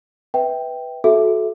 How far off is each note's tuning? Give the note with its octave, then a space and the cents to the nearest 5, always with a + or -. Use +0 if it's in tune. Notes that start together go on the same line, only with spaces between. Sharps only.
B4 +0 E5 -25 G5 +0
F#4 -15 A4 -25 E5 +0